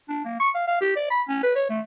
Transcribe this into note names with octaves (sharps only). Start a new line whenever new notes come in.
D4
A#3
C#6
F5
F5
G4
D5
B5
C#4
B4
C#5
A3